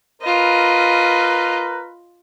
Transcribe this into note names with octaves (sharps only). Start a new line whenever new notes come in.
F4 A#4 B4 D#5